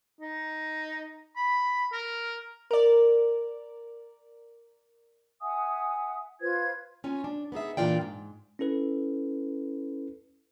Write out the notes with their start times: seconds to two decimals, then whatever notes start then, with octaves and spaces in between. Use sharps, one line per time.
0.21 D#4
1.36 B5
1.93 A#4
2.71 A#4 D5
5.41 E5 F#5 G#5 D#6
6.40 F4 B4 C5 G#6
7.04 C#4 F4 C#5 G#5
7.24 D4
7.52 B3 D#4 G#4 E5
7.77 A#2 E3 D4 F4 D5 G5
8.01 G#2
8.59 C#4 E4 A4 B4